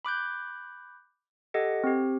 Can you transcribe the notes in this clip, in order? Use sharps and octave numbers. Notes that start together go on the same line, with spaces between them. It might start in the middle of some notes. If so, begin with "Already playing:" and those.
B5 D6 F#6 G6
G4 A4 D#5 F#5
C4 G4